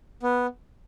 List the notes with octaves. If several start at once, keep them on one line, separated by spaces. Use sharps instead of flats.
B3